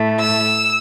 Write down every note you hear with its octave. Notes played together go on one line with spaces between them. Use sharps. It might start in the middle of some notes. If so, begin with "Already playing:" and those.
Already playing: A2 A3
E6